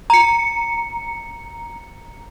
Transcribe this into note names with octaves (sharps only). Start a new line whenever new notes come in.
A#5 C#7